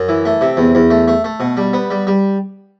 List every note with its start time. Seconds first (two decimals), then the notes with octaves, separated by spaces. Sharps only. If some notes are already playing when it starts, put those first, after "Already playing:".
Already playing: F#2
0.09 E3
0.25 A3
0.41 C3
0.57 E2
0.75 E2
0.90 A3
1.08 A3
1.24 A3
1.40 B2
1.57 G3
1.73 B3
1.90 G3
2.07 G3